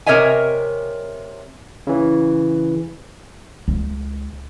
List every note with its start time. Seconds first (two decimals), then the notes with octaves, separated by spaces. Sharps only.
0.06 C3 A#4 C#5 D#5 E5 G#5
1.87 C#3 E3
3.68 C#2